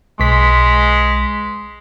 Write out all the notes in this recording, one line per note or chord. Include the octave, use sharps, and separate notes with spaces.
B1 G#3 B6